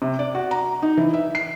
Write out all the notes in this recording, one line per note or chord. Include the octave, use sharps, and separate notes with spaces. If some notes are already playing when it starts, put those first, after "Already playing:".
C3
D5
F#4
A#5
D#4
E3
E5
C7